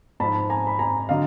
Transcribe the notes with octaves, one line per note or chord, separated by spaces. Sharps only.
G#2 F3 A5 B5
G#5 A#5
B5
G#5 A#5
D3 F#3 D#5 F5